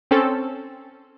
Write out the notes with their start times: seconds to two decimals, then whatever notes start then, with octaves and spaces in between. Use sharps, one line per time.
0.11 C4 C#4 A4